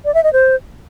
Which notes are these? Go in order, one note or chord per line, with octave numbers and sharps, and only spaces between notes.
D5
E5
D#5
C5